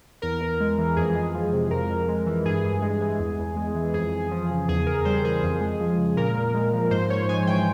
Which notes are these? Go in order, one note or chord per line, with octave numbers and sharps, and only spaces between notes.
E2 A#4
E2
G#3
E3
F2 G#4
G#3
F3
C3
F2 A#4
F2
G#3
E3
G2 G#4
G2
G#3
E3
E2
E2
G#3
E3
F2 G#4
F2
F3
C#3
E2 G#4
E2 A#4
G3 C5
E3 G#4
F2
G#3
F3
C#3
A#2 A#4
A#2
G#3
F3
G#2 C5
G#2 C#5
G#3 G#5
E3 G5